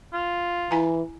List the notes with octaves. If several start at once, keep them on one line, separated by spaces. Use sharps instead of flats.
F4
E3 E4 G#5 A#5